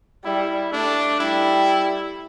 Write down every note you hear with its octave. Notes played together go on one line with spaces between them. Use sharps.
G3 E4
A3 D4
G3 E4